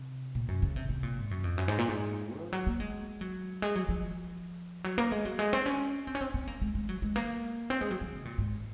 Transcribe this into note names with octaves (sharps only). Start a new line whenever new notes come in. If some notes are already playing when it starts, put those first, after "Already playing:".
Already playing: C3
A#2
F#2
C#3
C3
C3
A#2
G#2
F#2
F2
F#2
G#2
A#2
G#2
F3
F#3
A#3
G#3
F#3
G#3
F#3
F3
F#3
A#3
G#3
F#3
G#3
C4
C#4
C4
C#4
C4
C4
A#3
G#3
G#3
F#3
G#3
A#3
C4
G#3
F#3
F#3
C3
A#2
G#2